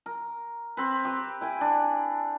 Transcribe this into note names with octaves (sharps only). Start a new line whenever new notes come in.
A#4
C4 B4
G4 B4
E4 G5 G#5
D4